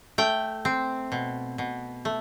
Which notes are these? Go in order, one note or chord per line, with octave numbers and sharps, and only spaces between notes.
A3 G5
C4
B2
B2
A3